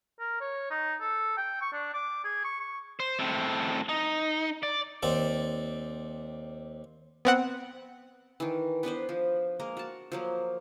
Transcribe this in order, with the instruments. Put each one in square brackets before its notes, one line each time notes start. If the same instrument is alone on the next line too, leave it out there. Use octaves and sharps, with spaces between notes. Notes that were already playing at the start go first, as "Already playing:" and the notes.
[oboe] A#4
C#5
D#4
A4
G5
C#6
D4
D6
G#4
C#6
C#6
[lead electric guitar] C5
A2 C4
D#4
D5
[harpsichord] D#2 C4 D5
[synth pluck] B3 C4 F#5
[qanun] D#3 E3
B3 D4 B4 C5
F3
G#3 A#3 A#4
F#4 A5
F3 F#3 A#3